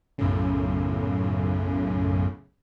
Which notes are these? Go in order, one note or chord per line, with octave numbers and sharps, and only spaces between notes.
B1 F#2 A2 C#3